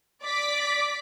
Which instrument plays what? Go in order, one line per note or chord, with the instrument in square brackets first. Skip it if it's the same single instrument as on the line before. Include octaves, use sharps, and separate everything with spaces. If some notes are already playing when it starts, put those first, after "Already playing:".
[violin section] D5 D6 B6